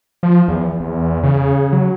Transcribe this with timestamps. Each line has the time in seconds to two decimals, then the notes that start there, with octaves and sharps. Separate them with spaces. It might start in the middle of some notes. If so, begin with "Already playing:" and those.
0.23 F3
0.48 E2
0.80 E2
1.23 C#3
1.72 F#3